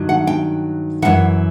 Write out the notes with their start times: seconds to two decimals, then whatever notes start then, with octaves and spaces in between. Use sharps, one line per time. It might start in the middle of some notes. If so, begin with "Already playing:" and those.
Already playing: G2 D#3 F#3
0.09 F#5
0.27 G5
1.02 F#2 C#3 E3 F#5